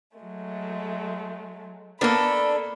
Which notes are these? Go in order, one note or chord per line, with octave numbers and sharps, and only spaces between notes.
F#3 G#3 A3
A#3 B3 D4 A4 B5